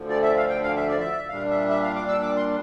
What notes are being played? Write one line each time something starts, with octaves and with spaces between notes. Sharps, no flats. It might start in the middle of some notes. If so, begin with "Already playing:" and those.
Already playing: D2 D3 F3
D5
E5
F5
G5
F5
E5
D5
E5
A#2 G3 D4 F5
E5
E5
F5
D6
E6
D6
C6